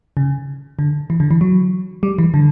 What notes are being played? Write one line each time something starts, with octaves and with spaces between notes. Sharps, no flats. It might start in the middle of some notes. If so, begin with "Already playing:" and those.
C#3
D3
E3
D3
E3
F#3
G3
E3
D3